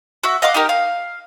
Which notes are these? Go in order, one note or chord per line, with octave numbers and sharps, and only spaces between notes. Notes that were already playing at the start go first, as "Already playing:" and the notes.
F#4 E5
D#5 F5 F#5 D6
D#4 G4 A#4
F5